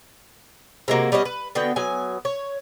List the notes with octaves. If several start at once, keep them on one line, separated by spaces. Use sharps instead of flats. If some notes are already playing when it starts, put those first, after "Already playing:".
C3 G#3 A#3 F#4
G3 B3 C#4 D#5
B4
D3 B3 F#4 G5
F#3 B3 G#5
C#5